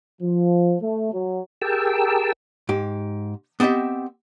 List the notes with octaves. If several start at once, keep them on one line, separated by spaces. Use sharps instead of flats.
F3
A3
F#3
G4 G#4 A#4 G5 A5 E6
G#2 G4
B3 C4 G4 D#5 E5